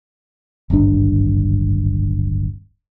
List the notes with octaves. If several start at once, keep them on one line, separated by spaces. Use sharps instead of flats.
D1 G#1 G2 D4